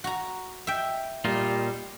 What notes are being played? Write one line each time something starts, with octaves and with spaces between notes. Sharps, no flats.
F#4 A#5
E5 G5
A#2 G3 D#4 F4